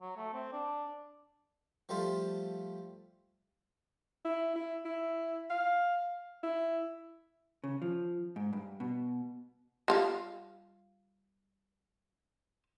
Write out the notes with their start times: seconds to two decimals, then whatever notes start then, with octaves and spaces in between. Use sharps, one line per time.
0.02 F#3
0.17 A3
0.33 C4
0.52 D4
1.89 F3 G3 A3 F4 A4 C5
4.25 E4
4.56 E4
4.85 E4
5.50 F5
6.43 E4
7.64 C#3
7.82 F3
8.36 G#2
8.53 G2
8.80 B2
9.88 G3 F4 F5